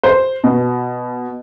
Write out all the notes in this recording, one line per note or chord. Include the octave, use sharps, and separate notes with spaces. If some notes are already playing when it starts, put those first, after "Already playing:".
C5
B2